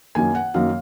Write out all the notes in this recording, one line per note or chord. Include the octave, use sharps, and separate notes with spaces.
F#2 D#3 A#3 G#5
F#5
F#2 D#3 A#3 F5